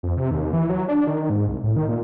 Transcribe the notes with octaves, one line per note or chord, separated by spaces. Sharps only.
F2
C3
D#2
E3
F#3
D4
D#3
G#2
C2
A2
D#3
A#2